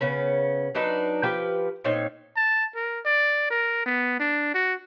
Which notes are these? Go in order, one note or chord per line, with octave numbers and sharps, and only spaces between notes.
C#3 B3 C#4
F#3 D4 D#4 B4
F3 G4 B4 G5
A#2 C4 D#4 C#5
A5
A#4
D5
A#4
B3
D4
F#4